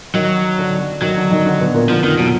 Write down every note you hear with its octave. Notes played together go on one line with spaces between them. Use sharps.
D#3 F#3 D#4
D3 D4
D#3 F#3 D#4
D3 D4
D#3 D#4
D3 D4
B2 B3
A#2 A#3
D3 F3
F2 D#3 F3
B2 F#3